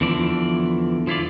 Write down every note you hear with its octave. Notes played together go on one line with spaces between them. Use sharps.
E2 D3 E3 F3 D5
F3 E4 F4 D5